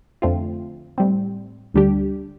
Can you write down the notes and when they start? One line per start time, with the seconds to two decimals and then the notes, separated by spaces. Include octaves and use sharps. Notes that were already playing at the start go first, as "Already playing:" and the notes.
0.22 F2 D3 A3 C4 F4
0.98 A2 G3 C4
1.74 D2 D3 G3 D4 G4